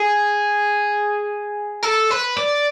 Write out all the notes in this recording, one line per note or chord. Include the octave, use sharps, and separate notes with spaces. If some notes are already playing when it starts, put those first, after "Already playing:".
Already playing: G#4
A4
B4
D5